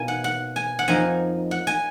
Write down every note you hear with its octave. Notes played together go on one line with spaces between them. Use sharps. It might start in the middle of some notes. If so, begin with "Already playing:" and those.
Already playing: B2 A#3 D#4 G#5
F#5
F#5
G#5
F#5
F2 F3 A#3 D#4 G#5
F#5
G#5